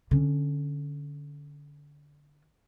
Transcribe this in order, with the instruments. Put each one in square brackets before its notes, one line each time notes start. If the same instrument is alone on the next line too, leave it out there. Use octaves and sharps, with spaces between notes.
[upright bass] D3 C#4